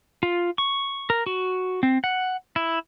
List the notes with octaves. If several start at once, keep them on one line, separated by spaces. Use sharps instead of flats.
F4
C#6
A#4
F#4
C4
F#5
E4